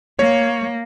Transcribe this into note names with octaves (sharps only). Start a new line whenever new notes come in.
A#3 C#5